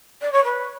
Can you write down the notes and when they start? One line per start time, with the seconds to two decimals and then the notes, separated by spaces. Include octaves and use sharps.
0.21 D5
0.32 C#5
0.44 B4